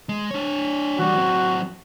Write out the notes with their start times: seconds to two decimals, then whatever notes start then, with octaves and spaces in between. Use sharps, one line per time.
0.09 G#3
0.31 D4 C#5
0.99 E3 G3 F#4
1.15 F#3 C4